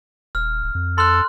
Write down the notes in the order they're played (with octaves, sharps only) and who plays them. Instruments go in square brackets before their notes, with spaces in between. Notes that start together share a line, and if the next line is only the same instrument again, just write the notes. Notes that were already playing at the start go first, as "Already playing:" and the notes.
[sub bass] D#1 [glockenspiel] F6
[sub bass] D1
F2
[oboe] A4 [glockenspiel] C6 F#6